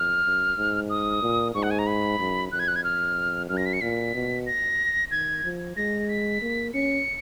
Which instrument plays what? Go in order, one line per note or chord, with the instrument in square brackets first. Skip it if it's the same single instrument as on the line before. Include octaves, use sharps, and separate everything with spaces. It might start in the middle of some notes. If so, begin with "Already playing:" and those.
Already playing: [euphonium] F2 [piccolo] F6
[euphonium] F#2
G#2
[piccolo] D#6
[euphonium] A#2
[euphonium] G#2 [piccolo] C#6
[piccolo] F#5
G#5
A#5
B5
[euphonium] F#2
[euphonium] F2 [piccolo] F#6
[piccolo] G#6
F#6
G#6
F6
[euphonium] F#2 [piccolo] F6
[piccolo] A#6
B6
C#7
[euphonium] A#2 [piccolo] B6
[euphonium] B2
[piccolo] A#6
[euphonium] D#3 [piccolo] G#6
[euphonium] F3
[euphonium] G#3 [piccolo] A#6
[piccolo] B6
[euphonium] A#3
[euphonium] C#4 [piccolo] C#7